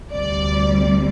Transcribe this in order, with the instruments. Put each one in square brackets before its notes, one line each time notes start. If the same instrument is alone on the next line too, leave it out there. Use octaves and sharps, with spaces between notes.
[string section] D2 C3 G3 D5